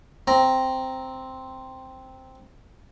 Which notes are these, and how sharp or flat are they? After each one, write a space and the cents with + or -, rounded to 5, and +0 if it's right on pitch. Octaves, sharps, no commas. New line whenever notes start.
C4 +0 A#5 +0